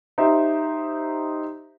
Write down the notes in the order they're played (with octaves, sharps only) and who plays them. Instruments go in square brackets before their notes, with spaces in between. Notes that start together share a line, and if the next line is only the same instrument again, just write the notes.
[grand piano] D#4 G4 C5 E5